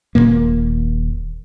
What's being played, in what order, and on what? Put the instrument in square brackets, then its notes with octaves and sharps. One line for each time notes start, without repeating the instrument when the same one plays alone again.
[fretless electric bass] D#1 G2 A#2 A#3